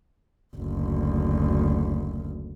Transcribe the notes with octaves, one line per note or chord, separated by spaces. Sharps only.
F#1 D2